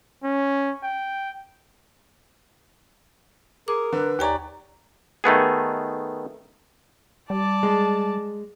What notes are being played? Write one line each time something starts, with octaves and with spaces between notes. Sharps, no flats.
C#4
G5
G#4 A#4 D6
D3 B4
D#2 G4 C#5 D5 G#5 A#5
D#3 A3 B3 G#4
G3 D5 A5
G#3